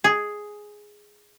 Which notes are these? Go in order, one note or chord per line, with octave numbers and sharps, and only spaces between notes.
G#4